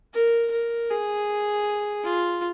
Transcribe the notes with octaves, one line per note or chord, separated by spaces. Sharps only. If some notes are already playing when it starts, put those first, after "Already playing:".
A#4
A#4
G#4
F4